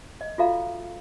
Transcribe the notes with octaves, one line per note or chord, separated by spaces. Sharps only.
D#5
F4 F#4 A4 E5 F5 A#5